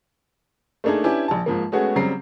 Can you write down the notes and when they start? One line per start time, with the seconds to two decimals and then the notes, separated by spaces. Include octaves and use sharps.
0.84 A3 A#3 D4 D#4 G#4
1.04 C#4 D4 E4 G4 B4 G#5
1.28 A#1 A5
1.46 G#2 F3 A#3
1.72 G#3 A3 B3 C#4 F#4 G#4
1.96 C#3 F#3 G3 C4 A#5 C7